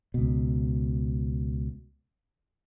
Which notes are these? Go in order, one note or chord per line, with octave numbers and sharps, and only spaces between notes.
C#2 B2